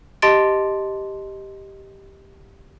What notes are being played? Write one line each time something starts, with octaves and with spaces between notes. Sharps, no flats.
G4 D#5 A5 C6 A6 D7